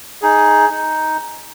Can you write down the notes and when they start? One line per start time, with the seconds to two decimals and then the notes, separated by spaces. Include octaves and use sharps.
0.22 D#4 G#4
0.70 D#4